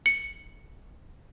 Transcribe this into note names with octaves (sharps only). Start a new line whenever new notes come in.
C#7